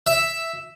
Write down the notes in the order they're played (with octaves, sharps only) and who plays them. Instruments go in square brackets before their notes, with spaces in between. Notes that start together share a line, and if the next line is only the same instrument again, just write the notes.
[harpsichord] E5